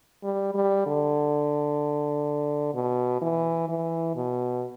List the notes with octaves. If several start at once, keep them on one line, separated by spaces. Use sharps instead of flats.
G3
G3
D3
B2
E3
E3
B2